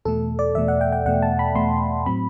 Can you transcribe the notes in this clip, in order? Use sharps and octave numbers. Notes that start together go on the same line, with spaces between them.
E2 B2 A3 A4
D5
E2 B2 A3 E5
F#5
G5
G5
E2 B2 A3 F#5
A5
B5
E2 B2 A3 C6
A2 F#3 C4 B5